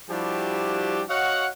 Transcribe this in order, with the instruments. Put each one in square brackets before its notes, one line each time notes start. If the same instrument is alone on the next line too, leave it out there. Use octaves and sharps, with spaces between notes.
[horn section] F3 G3 D4 E4 F#4 G4
F#4 C#5 D#5 F5 F#5